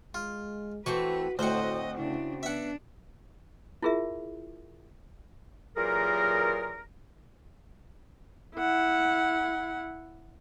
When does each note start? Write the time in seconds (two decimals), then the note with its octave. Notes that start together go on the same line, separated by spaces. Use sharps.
0.14 G#3 F4
0.86 E3 A3 C4 F#4 B4 C#6
1.39 D2 A2 C4 F#4 C5 D#5 F#5
1.98 C#3 D4 E4
2.43 B3 D4 E5 F#5
3.82 E4 F4 G#4 A#4 E5
5.76 A#2 E3 F#3 G4 G#4 A#4
8.56 E4 F#5